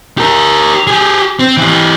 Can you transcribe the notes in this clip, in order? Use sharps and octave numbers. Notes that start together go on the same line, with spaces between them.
G4 A#4
G4 G#4
C4
E3 G4